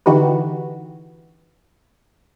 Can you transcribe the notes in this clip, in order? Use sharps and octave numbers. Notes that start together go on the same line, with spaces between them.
D3 E3 D#4 F#4 G4 B4